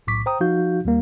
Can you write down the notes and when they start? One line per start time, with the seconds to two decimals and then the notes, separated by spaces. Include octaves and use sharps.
0.07 B1 A2 C#6 D6 B6
0.26 C5 G5 A#5 D#6
0.40 F3 D#4 F#4 F5 G6
0.85 D#2 G3 A#3